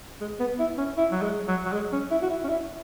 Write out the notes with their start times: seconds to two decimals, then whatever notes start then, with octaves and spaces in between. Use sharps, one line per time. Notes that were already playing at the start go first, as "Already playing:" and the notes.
0.21 G#3
0.40 B3
0.59 E4
0.78 C#4
0.97 E4
1.11 F#3
1.22 G#3
1.48 F#3
1.65 F#3
1.72 G#3
1.92 C#4
2.11 E4
2.22 F#4
2.30 E4
2.44 C#4
2.49 E4